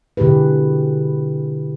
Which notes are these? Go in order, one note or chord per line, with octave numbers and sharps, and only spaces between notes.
B2 D3 E4 G4 G#4 B4